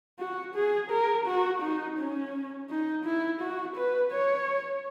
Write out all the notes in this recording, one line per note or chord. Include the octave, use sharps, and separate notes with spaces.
F#4
G#4
A#4
F#4
D#4
C#4
D#4
E4
F#4
B4
C#5